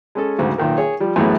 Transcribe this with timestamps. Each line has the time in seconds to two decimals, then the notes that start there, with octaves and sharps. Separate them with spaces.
0.15 G#3 C#4 A4
0.38 D2 G#2 C#3 F#3
0.58 B1 A#2 D#3 A#4
0.78 G#4 C#5
1.00 F3 G3
1.16 F#2 A2 E3 G#3 A3 B3